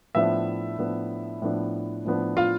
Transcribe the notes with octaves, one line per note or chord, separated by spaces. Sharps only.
A2 F3 B3 D4 E5
A2 F3 B3 D4
A2 F3 B3 D4
A2 F3 B3 D4
F4 F5